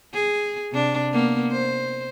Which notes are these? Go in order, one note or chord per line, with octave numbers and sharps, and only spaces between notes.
G#4
C3 D4
A#3 B3
C5